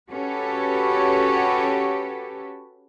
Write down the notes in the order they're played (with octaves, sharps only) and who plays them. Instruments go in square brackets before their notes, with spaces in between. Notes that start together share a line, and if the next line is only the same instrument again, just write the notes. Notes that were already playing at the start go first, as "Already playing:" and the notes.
[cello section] C#4 F#4 G4 A4 B4 C#5